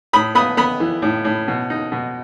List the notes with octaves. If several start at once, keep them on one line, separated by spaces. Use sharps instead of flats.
A2 B5 D#6
B3 B5 D#6
B3 B5 D#6
E3
A2
A2
B2
D#4
B2